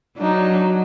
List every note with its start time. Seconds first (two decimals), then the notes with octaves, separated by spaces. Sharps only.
0.18 F#3 D4 D#4